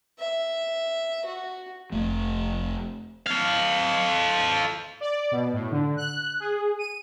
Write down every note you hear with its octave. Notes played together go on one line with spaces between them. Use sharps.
E5
F#4
F1 A3
A4 F5
D5
B2
A2
D3
F#6
G#4
D#7